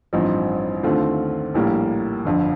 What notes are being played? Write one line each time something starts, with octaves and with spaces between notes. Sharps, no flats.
A1 G2 F3 C4 D#4
D#2 D3 A3 C4 F4
A#1 A2 G3 A#3
G1 F2 D3